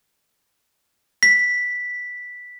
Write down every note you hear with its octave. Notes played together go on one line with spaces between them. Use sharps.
B6